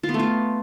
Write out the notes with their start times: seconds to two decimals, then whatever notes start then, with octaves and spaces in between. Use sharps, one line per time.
0.03 F4
0.09 B3
0.14 A3
0.19 F4